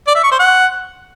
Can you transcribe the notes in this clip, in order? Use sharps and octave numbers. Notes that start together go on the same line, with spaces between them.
D5
E5
C#6
C5
F#5